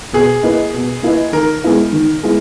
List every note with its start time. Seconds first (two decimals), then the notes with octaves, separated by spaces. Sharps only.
0.13 B2 G#4
0.43 A#3 E4 B4 D#5
0.74 B2
1.03 A#3 E4 B4 D#5
1.33 D#3 A#4
1.63 G#3 B3 E4 B4
1.93 D#3
2.23 G#3 B3 E4